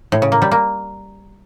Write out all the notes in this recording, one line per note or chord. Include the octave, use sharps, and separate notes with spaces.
A2
C#3
A#3
G3
A#3